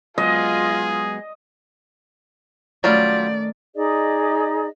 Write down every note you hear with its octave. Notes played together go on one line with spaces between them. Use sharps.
F#3 G#3 B3 F4 G#4 D#5
D#3 F#3 G3 A3 C#4 F4 D5
D#4 G#4 D5 D#5